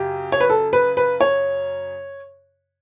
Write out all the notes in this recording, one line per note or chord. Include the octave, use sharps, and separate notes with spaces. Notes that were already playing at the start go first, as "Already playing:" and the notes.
Already playing: F#2 C#3 G4
C#5
B4
A4
B4
B4
C#5